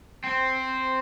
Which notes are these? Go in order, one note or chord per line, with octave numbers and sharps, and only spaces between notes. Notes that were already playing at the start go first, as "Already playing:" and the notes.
C4